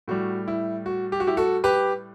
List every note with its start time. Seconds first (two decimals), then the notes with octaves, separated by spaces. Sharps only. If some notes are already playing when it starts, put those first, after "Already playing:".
0.08 A2 G3 F#4
0.48 E4
0.86 F#4
1.12 G4
1.20 F#4
1.27 E4 G4
1.37 F#4 A4
1.64 G4 B4